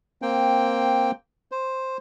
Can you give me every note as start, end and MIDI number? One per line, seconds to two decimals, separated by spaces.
0.22 1.11 58
0.22 1.11 60
0.22 1.11 79
1.52 1.97 72